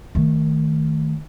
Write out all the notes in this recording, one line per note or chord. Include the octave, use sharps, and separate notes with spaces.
D#3 A3